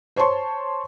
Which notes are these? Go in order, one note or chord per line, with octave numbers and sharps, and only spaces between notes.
C5 C#5 A5 C6 C#6